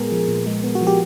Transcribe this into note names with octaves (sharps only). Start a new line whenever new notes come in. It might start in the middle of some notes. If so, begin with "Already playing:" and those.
Already playing: A#2 G#3 B3 G#4 A#4
F3
A#2
G#3
B3
F#4
F3
G4